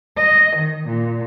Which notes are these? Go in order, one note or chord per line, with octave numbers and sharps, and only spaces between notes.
D#5
D#3
A#2